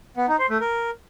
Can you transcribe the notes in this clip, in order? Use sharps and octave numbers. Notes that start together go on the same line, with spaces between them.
B3
D#4
C5
A3
A#4